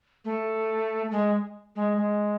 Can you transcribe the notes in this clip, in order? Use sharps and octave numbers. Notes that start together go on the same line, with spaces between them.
A3
G#3
G#3
G#3